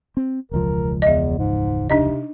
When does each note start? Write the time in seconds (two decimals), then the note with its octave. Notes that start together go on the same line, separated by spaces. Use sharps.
0.17 C4
0.51 E1 C#2 F3 A#4
1.02 E2 D#5 E5
1.38 G#2
1.90 C3 D4 D#4 D#5